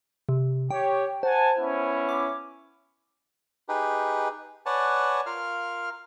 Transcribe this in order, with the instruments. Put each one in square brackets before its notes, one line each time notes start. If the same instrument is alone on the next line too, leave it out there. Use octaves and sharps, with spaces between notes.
[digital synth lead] C3
[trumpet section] G4 C#5 [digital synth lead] G5
[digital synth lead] C5 [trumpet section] F#5 G#5 A5
[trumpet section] B3 C#4 E4
[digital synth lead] D6
[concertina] D#4 G4 G#4 B4
B4 C#5 D5 F#5 G#5 A5
F4 A#4 F5 F6